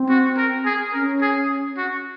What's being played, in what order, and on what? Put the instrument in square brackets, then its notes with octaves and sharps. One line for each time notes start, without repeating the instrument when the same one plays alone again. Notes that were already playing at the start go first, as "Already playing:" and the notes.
Already playing: [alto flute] C4
[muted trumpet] F#4
A#4
G#4
[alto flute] C#4 [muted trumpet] A#4
[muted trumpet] G#4
F#4